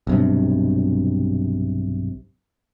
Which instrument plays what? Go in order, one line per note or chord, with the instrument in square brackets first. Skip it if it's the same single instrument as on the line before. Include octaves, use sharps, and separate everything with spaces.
[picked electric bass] B1 G2 C3